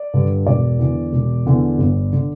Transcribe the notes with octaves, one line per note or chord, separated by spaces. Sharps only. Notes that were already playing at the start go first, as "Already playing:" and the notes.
Already playing: D5
G2 D3
E1 D5
E2 D3
E1
E2 D3
G1
D3